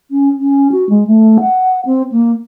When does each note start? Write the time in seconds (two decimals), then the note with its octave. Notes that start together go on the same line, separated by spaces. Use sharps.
0.11 C#4
0.39 C#4
0.72 F#4
0.89 G#3
1.07 A3
1.40 F#5
1.86 C4
2.12 A#3